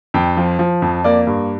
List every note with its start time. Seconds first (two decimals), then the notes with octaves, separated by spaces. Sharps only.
0.14 F2 G5
0.37 F3
0.59 F3
0.82 F2
1.04 A#3 D5
1.27 G2